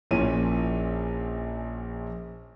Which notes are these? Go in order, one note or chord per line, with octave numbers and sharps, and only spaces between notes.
A#1 A#2 C#4 E4 D#7